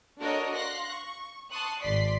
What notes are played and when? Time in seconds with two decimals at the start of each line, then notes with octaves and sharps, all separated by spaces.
0.19 D4 F#4 A4 A#4 C#5 D#5
0.55 F5 C6 F#6 A#6
0.90 C#6
1.50 A5 C6 C#6 D#6 F#6
1.82 G#1 D5 C6 B6 C7